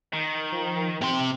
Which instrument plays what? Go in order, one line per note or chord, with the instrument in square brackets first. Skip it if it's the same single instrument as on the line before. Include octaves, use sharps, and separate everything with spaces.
[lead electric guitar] D#3
[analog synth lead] F3
[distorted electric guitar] C3 C6 [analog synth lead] G5